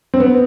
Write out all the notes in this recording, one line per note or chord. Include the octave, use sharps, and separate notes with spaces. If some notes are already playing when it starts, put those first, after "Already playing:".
C4
B3